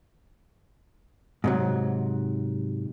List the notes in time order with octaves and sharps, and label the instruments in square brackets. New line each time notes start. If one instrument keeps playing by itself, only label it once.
[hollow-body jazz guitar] G#2 C3 F#3